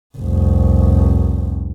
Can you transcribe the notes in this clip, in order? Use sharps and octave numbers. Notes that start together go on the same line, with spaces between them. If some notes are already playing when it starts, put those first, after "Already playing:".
F1 C2